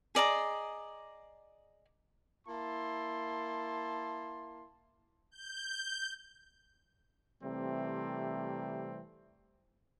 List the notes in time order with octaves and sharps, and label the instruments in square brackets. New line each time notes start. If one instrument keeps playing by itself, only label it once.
[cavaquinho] G#4 D5 D#5 A#5
[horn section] A#3 E4 A5 C6
[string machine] G6
[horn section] C3 E3 G3 A3 C4